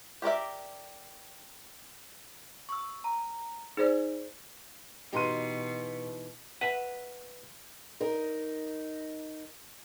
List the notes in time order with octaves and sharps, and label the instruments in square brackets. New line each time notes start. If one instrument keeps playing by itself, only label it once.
[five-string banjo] G4 A#4 D5 E5
[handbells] C#6 E6
A#5
[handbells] D#4 [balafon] G#4 C5 D5
[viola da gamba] B2 [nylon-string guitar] E3 D#4 G4 [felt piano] F#4 C6 D#7
[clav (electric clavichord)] B4 E5 [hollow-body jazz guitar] F#5
[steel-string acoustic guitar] D#4 A#4